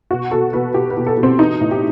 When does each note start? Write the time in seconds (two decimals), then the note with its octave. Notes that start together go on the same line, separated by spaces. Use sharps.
0.11 B2 F#4
0.31 B2 A4
0.53 B2 B4
0.74 B2 G4
0.90 B4
0.97 B2
1.07 A4
1.17 B2
1.23 C4
1.39 E3 D#4
1.61 A2
1.71 G4